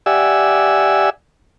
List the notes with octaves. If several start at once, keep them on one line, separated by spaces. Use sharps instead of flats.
G4 D5 E5 F#5 G#5 E6